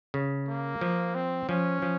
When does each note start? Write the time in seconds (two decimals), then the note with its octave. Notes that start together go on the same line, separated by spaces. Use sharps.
0.14 C#3
0.48 A#3
0.81 F3
1.15 C4
1.49 F3 C#4
1.82 F3